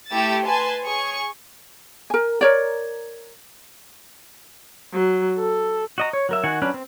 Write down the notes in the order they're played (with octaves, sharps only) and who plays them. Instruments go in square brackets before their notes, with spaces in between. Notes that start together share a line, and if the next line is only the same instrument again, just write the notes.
[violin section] A3 E4 G4 E6 A6
B4 G#5 A5 C6
G#4 C#5 C#6
[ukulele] A#4 G#5
A#4 C#5 D5
[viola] F#3
A4
[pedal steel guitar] F#4 D#5 A#5
C#5
F#3 A#4 E5
D#3 F#4 F#5 G#5
F#3 C#4 D4 B4
C4